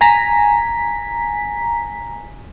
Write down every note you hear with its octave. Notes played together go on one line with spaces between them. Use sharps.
G#5 A#5 B6